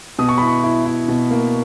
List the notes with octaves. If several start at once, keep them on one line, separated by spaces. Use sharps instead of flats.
B2 D#6
C#6
E4 B5
C#6
E4
E4
B2
A#3